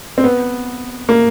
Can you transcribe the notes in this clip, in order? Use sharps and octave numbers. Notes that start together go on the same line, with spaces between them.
C4
B3
A#3